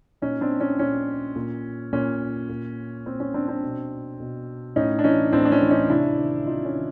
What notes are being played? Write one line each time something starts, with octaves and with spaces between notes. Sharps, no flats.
A#2 C#4 D#4
C4 D4
C#4
A#2 C#4
A#2
A#2 C#4
A#2
A#2 C4
C#4
C4 D4
C4 D4
B2
B2
A2 C#4 D#4
D4
E3 C#4 D#4
A2 C4 D4
D4
C#4
E3
C#4 D#4
C3 D4 E4
D#3
C3 D#4 F4
C#4
D#3